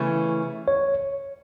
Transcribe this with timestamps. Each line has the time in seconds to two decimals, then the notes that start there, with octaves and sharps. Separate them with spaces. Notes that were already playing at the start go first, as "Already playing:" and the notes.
Already playing: C#3 E3 A3 C#4
0.68 C#5